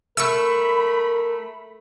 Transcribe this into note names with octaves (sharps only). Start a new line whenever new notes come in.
A3 A#4 B5 C#6 E6